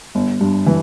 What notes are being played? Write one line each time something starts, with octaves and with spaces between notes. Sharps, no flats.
G1
G2
E3